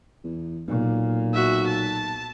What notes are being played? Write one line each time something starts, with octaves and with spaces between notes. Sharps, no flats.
E2
B1 A#2
F#4 E5
A5